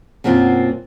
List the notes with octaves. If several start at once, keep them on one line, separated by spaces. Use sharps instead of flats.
F#2 B2 A#3 C4 F4